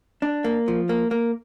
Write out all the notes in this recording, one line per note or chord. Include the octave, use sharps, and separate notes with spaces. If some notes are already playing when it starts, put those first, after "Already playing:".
D4
A#3
F3
A#3
A#3